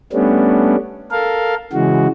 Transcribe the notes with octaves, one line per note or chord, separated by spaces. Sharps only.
G3 A3 B3 C#4 D4
A4 A#4 F5
C#3 E3 G#3 F#4